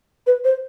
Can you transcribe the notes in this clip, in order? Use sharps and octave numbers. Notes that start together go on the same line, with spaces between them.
B4
C5